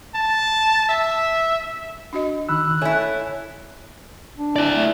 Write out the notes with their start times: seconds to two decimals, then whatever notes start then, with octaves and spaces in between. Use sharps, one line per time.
0.15 A5
0.89 E5
2.13 D4 F#4 D#5
2.49 D#3 B5 E6 F#6
2.81 A3 E4 C#5 G#5
4.38 D4
4.56 E4 D5
4.75 A3